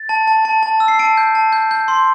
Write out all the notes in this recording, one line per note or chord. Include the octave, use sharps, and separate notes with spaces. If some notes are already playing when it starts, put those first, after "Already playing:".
Already playing: A6
A5
A5
A5
A5
E6
C7
A5 D7
G6
A5
G6
G6
C6